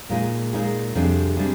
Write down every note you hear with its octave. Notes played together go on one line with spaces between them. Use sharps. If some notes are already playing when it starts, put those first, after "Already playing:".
A#2 G#3 D#4 G#4
A#2 G#3 D#4 G#4
F2 C3 G3 D4 G#4
C3 G3 D4 G#4